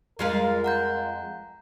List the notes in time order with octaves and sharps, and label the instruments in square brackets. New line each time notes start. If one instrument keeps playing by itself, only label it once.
[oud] F2 G#3 B4 [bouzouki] F4 F5 [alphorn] A#4
[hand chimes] F#5 A#5 G6